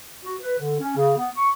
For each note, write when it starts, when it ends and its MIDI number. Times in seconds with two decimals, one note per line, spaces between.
0.24 0.36 66
0.41 0.55 71
0.59 0.76 50
0.81 0.94 61
0.96 1.17 49
1.17 1.30 59
1.36 1.50 85